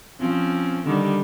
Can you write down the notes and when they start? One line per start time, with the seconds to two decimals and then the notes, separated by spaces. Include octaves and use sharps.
0.20 F3 C4 C#4
0.86 D3 D#3 G3